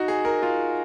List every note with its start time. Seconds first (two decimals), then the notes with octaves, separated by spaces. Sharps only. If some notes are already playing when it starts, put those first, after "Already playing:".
Already playing: D#4 F#4
0.08 G#4
0.25 A#4
0.43 F4